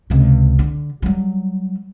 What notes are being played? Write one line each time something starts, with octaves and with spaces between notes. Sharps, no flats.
C#2 C3
D3
F#3 G3